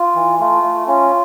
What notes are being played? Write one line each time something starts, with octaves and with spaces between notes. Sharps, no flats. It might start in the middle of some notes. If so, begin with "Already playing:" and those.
Already playing: F4
E3
A3 F4
A3
C#4 F4